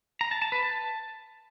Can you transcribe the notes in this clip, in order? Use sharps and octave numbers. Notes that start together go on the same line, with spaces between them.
A#5
A5
A5
B4
A5